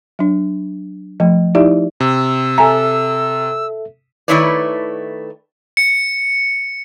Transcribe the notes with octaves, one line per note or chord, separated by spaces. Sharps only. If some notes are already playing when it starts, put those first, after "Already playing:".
F#3 D4
F3 A3
D#4 E4 G4 D5 E5
C3 E6
A4 E5 G#5 A#5
D#3 A3 E4 B4 C#5 D5
C#7